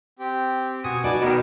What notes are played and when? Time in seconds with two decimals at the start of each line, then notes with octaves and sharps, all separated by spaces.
0.19 C4 G4
0.84 B2 F#4 G#5 C#6 D#6
1.04 D#4 F#4 B4 D5 G#5 A5
1.22 B2 D#3 A#4